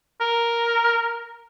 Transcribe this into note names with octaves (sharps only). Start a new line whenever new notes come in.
A#4